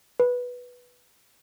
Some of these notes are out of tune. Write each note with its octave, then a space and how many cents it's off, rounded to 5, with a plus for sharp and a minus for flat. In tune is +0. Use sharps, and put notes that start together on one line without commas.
B4 -5